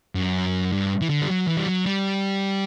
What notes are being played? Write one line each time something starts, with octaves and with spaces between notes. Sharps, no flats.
F#2
G2
E3
D3
G3
F#3
E3
G3
F#3
G3